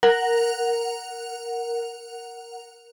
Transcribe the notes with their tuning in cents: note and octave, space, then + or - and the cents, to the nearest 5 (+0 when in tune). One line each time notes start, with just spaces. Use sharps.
A#4 +0 F#5 +0